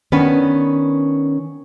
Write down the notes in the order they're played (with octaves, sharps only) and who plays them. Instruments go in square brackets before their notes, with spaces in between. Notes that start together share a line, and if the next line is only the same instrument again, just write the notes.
[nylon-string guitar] D#3 B3 C#4 D4 B4